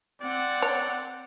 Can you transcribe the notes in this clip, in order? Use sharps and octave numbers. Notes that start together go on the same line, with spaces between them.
C4 D5 F#5
C#5